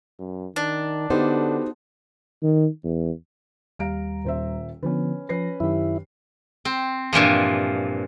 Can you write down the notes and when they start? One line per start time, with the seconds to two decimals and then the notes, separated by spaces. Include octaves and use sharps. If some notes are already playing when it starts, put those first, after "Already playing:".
0.20 F#2
0.56 D#3 D4
1.10 D3 B3 D#4 F#4 G4 A4 C5
2.42 D#3
2.84 E2
3.79 D#2 G3 F5 A#5 D7
4.24 D#1 C5 E5
4.83 D3 F3 B3 C#4 B4
5.29 F3 C#4 B4 A#6 C7
5.60 F#2 D#3 E4 G4
6.65 C4
7.13 G2 A#2 E3 F3